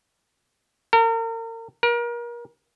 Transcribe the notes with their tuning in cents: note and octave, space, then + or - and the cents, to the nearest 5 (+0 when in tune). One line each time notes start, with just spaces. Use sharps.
A#4 -35
A#4 +35